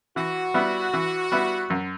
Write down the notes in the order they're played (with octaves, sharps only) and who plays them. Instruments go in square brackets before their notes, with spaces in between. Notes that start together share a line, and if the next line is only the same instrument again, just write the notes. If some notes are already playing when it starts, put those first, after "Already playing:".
[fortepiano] E3 [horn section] F#4
[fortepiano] G3 B3 E4
E3
G3 B3 E4
F#2